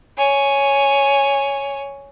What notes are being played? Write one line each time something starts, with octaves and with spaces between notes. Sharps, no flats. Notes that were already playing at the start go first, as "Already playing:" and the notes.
C#5 G#5